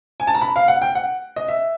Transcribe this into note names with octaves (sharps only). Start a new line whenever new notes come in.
G#5
A5
A#5
B5
F5
F#5
G5
F#5
D#5
E5